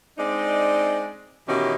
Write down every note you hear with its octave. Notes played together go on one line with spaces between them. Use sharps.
G#3 C4 D4 D#4 D5
B2 D#3 E3 C#4 G4